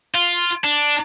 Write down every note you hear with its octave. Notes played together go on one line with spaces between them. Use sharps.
F4
D4